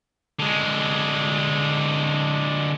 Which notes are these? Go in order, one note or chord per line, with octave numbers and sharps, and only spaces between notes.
D3 G#3